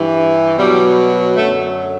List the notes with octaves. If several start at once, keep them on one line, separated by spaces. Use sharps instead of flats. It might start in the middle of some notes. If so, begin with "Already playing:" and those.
Already playing: G2 E3
B2 F#3 G3
F#2 D3 F#3 A3